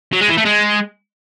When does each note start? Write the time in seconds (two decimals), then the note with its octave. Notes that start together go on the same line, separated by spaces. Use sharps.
0.13 F#3
0.21 G#3
0.29 E3
0.37 A3
0.45 G#3